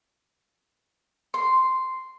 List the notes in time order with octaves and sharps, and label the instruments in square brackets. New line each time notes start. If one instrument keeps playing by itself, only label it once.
[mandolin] C6